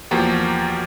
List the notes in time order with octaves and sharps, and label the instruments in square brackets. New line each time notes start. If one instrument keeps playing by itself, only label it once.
[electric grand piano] E2 F3 A#3 F#4 G4